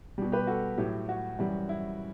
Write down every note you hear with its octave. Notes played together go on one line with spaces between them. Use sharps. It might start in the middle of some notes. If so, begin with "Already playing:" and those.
B2 G3
G4 B4
F#4 A4
A2 F#3 E4 G4
F#4
F#2 E3 G3
E4